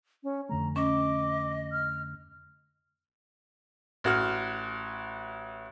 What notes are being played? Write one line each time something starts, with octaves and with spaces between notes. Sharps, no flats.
C#4
F2 D3 A3 A#5
C#4 D#5 D6
F6
A1 F#4 F6